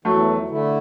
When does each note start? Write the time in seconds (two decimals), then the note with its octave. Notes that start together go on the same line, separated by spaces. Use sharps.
0.05 E2 F#3 A3
0.48 D3 A3 E4